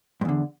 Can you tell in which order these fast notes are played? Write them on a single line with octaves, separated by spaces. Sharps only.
G2 E2 D3